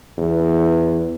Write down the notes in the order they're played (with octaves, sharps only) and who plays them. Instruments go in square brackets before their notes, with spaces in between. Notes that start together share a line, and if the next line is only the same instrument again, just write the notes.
[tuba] E2